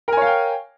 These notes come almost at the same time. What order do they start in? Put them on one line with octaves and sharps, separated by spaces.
A#4 G#5 C#5 F5 G5